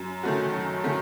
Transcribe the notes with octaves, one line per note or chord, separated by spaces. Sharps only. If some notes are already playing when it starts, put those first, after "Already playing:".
Already playing: F#2
D#3 A3 C#4 F#4
F#2
D#3 A3 C#4 F#4